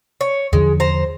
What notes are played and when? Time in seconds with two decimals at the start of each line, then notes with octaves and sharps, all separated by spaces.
0.21 C#5
0.53 E2 D3 F3 G#3
0.80 C5 A#5